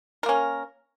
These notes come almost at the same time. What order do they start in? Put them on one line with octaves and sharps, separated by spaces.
A#4 A#3 C#4